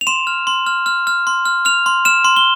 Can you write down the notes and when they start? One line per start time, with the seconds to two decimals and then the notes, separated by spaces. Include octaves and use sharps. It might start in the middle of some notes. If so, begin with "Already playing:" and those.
0.01 F7
0.07 C6 E7
0.27 F6
0.47 C6
0.66 F6
0.86 F6
1.07 F6
1.27 C6
1.45 F6
1.65 F6 F7
1.86 C6
2.05 F6 E7
2.24 C6
2.36 G7